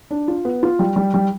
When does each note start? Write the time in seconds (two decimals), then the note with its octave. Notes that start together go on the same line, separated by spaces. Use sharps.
0.11 D4
0.28 F4
0.45 B3
0.63 F4
0.79 G3
0.96 G3
1.14 G3